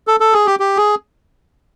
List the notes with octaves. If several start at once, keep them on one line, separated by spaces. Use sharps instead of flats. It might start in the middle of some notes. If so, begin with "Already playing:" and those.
A4
A4
G#4
G4
G4
G#4